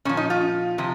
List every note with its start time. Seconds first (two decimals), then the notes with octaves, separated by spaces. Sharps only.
0.05 A#2 F3 C#4
0.17 D#4
0.30 F4
0.78 C3 F3